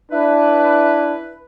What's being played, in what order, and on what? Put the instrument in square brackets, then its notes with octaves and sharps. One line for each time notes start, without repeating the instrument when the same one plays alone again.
[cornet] D4 [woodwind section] E4 B4